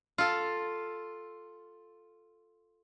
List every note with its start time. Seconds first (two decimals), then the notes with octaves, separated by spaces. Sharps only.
0.18 F4 A4